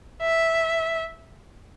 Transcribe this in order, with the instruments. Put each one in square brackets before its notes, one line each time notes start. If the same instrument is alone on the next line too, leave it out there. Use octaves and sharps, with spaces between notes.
[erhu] E5